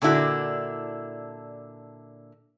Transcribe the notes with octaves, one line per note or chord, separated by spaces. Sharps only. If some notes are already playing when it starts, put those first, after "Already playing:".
A#2 D3 D4 E4 F#4